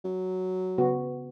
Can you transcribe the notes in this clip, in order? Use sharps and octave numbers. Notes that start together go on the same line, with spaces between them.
F#3
C#3 B3 F#4